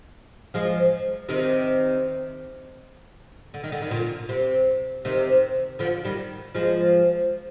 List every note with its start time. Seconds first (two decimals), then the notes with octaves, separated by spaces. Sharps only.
0.54 F3 G#3
1.29 C3 D#3
3.54 D3
3.63 D#3
3.72 D3
3.82 D#3
3.91 A#2 D3
4.29 C3
5.05 C3 D#3
5.79 D3 F3
6.04 D#3 G3
6.54 F3 G#3